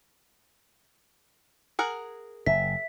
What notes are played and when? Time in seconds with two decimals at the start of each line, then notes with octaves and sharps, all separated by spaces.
1.79 G#4 A#4 F#5
2.46 F#1 E5 B6